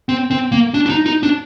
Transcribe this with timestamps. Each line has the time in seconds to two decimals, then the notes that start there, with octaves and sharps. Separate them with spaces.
0.09 C4
0.31 C4
0.52 A#3
0.74 D4
0.86 D4
0.89 D#4
1.06 D#4
1.23 D4